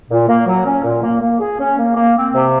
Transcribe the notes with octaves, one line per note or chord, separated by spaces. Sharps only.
A#2
A#3
F#3
C#4
A#2
A#3
A#3
G#4
C#4
A#3
A#3
C4
C3